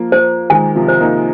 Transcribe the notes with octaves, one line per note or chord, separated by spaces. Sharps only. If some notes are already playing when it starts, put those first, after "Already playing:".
Already playing: F3 A#3
C5
D#3 G#3 G#5
C3 F3
C5
A#3 D#4